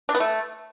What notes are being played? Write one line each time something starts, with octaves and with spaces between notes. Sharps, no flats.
D4
B3
A3